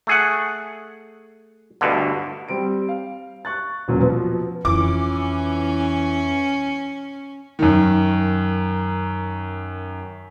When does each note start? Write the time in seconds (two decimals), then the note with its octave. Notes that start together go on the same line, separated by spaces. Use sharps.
0.07 A3 G#4 F#5
1.81 D2 G2 B2 D3
2.48 G3 C4 D7
2.89 F5
3.45 C#6 F#6 A6
3.88 E1 A#2 F#3 C#4
4.01 B2 F3 B3
4.65 F2 E3 C#4 F4 D6
7.59 F#2 D#3